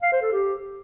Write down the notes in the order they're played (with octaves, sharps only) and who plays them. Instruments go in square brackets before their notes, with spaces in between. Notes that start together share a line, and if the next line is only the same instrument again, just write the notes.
[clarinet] F5
C5
A4
G4